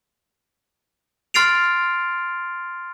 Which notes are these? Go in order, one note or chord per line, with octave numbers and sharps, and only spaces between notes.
C6 F6 A6 C7 D7 F7